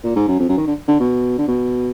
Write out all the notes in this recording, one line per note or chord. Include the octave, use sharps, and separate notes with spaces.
A#2
G#2
F#2
F2
F#2
D#3
D3
D3
B2
D3
B2